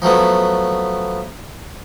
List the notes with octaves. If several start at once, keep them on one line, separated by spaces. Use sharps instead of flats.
F3 F#3 A3 B3